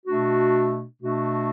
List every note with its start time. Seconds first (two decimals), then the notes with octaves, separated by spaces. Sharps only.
0.06 B2 A3 D4 F#4
1.00 B2 A3 D4 F#4